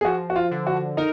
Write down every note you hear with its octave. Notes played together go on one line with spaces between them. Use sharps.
G#4
F3 F#4
F#4
F4
D3
F#4
D#4 A#4